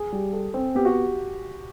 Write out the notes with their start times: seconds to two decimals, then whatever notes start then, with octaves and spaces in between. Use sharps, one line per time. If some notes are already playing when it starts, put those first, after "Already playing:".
Already playing: G#4
0.12 G3
0.33 A4
0.54 C4
0.75 B3 G4
0.85 F#4